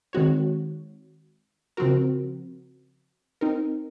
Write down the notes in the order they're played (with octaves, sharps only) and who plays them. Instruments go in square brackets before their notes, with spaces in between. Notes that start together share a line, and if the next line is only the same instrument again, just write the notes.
[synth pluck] D#3 G#3 C4 F#4 C#5
C#3 F3 C4 F#4 A#4
C4 D#4 A#4